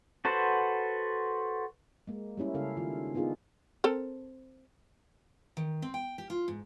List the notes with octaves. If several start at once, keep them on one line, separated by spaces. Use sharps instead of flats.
F#4 A4 B4 C5 F#5
G#3 A#3
G3 A#3 C#4 E4
C#3 G#3 C#4 E4 A4 F5
D#3 E4 F4
B3 D4 D#4 F4 G#4
C4 A4 A#4
D#3
C4
G5
G4
F4
G#2